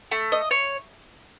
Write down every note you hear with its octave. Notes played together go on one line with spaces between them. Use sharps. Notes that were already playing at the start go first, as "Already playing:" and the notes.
A3
D#5
C#5